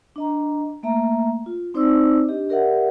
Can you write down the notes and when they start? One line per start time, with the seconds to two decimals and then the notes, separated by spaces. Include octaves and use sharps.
0.16 D4 D#5 A#5
0.83 A3 A#3 E5 A#5
1.46 F4
1.74 C4 D#4 C5 D5 D6 E6
2.28 D4 G4 D#5
2.49 G4 A#4 D5 E5 F#5